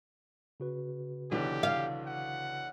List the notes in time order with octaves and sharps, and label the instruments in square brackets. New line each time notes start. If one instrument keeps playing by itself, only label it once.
[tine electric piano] C#3 F#4 B4
[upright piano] B1 D3 E3 [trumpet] G4
[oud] F5
[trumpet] F#5